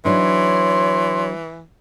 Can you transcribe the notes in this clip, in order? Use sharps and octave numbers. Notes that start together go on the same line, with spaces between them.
E3 F#3 D4 D#4 C#5 C6